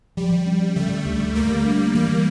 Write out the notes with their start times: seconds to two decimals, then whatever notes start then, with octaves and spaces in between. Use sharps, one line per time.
0.17 F3 G3
0.46 C#4
0.76 D3 A3
1.05 D2
1.35 G3 A3 A#3
1.64 D4
1.95 E3 G3 A#3